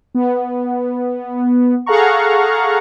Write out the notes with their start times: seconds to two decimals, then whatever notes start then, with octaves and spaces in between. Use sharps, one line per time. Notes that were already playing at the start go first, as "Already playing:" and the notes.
0.15 B3
1.86 G#4 A4 F5 F#5 A#5 C#6